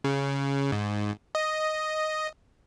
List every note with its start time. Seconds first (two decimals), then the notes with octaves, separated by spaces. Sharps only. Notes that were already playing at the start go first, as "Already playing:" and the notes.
0.04 C#3
0.72 G#2
1.35 D#5